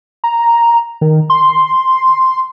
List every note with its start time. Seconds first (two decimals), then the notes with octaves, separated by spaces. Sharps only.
0.24 A#5
1.01 D#3
1.30 C6